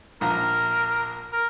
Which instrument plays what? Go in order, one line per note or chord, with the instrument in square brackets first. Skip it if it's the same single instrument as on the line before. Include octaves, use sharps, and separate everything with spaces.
[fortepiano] A#1 A#5 [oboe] A#4
[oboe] A#4